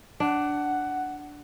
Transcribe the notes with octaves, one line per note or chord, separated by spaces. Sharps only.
D4 F#5